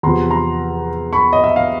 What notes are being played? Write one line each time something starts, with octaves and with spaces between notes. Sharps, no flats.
E2 C3 F3 A#5 C6
A#5 C6
B5 C#6
D#5
E5
F5